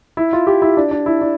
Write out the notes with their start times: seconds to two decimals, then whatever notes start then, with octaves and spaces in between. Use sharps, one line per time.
0.17 E4
0.33 F4
0.47 G4
0.62 E4
0.77 D4
0.91 D4
1.06 E4
1.21 D4